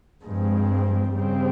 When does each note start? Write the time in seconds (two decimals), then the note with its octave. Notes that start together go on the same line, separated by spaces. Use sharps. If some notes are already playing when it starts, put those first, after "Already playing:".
0.25 G2 F3 G#3 C4
1.15 C#3 G3 C4